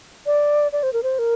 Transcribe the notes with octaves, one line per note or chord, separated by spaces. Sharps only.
D5
D5
C5
A#4
C5
A#4